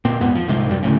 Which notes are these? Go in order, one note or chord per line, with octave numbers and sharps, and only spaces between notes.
A#2 C4
F2 G#2 B3
F3
C2 G#2 C3
F1 F#2 G3
A1 D2 A2 C#3